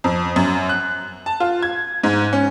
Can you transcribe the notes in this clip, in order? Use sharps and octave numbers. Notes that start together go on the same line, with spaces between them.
F2
F#2
F#6
A5
F4
G#6
G#2
C#4